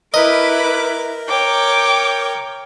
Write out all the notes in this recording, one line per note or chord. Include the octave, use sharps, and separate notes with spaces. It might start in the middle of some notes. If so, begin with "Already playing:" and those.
E4 A#4 B4 D#5 D6
C#5 G5 D6